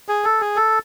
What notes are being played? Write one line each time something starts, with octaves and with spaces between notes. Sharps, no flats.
G#4
A4
G#4
A4